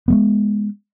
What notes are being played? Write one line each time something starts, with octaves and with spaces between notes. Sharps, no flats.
G#3 A3 B3